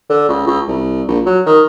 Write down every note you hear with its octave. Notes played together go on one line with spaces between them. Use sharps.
D3
C#2
C#2
C2
A#1
F#3
D#3